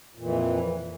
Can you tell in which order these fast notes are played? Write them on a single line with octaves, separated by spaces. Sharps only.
A#2 F2 E3